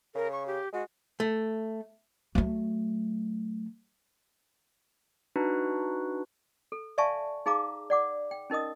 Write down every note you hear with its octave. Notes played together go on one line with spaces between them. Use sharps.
C#3 A#4
C#6
G4
G#3 F#4
A3
F#3 A3
D4 D#4 F#4 B4
A4
D5 E5 F5 G#5 A5 C#6
D#4 G#4 F5 A#5 D6
D5 F#5 D6
G5
C#4 D#4 A#4 D#5 D#6